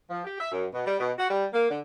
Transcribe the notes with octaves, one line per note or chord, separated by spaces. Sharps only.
F3
G4
E5
F#2
B2
G3
B2
F#4
G3
A#3
D3